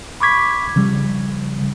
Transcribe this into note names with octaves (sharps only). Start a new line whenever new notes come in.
B5 C#6 D6 G#6 B6
C#3 F3 G3